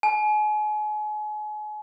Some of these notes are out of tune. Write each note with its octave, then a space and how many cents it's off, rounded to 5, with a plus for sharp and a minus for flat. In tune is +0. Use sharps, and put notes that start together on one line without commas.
G#5 +35